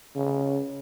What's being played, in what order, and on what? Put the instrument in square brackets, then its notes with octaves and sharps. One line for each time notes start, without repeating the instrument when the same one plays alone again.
[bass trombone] C#3